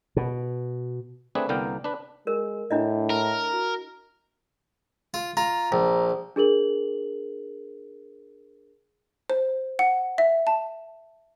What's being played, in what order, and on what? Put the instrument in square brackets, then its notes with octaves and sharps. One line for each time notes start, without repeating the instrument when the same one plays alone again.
[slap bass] B2
[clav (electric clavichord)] A3 C4 D4 G#4 B4
C2 D3 A#3 B3 A#4 G5
D4 B4
[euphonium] G#3 [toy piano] A#4
[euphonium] A2 [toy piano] D4 E4 D#5
[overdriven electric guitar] A#4
[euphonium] F#4
[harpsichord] F4
[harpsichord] F4 [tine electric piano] A#5
[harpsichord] A#1
[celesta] D4 G#4 A#4 F#7
[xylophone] C5
F#5
E5
A5